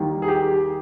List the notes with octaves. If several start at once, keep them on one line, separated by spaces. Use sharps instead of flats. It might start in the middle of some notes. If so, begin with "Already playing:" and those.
Already playing: D#2 D#3 G3
G#4
G4